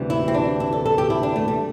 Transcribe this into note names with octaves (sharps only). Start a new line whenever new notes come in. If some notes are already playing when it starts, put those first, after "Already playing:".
Already playing: D2 C3 E3 G3
E4
C4
D4
E4
A4
A4
G4
E4
D4
A3
G3